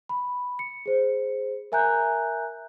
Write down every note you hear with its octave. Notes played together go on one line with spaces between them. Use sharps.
B5
C#7
G#4 C5
A#4 E5 G#5 A#5 F#6 G6